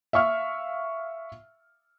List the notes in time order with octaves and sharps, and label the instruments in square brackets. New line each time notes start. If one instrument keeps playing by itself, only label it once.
[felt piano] E5 F5 C#6 F6